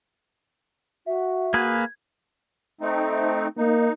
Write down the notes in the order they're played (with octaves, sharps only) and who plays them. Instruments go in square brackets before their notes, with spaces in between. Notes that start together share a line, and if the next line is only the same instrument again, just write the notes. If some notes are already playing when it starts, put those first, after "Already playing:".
[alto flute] F#4 [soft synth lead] E5
[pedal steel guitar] A#3 G#4 B4 [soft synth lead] G#6
[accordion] A3 C4 D#4
[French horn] A#3 [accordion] D#4